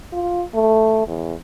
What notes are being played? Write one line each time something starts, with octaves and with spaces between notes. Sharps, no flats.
F4
A3
E2